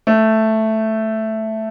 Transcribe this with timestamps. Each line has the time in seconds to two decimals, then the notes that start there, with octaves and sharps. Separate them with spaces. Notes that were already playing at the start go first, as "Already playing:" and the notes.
0.07 A3